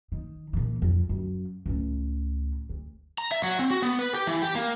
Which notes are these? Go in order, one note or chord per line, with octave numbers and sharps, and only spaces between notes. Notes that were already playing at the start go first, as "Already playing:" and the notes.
D#3
A#2 E3
F2
F#2
C#2 A2
D2
A#5
E5
F#3
C4
F#4
B3
B4
G4
E3
G4
A#3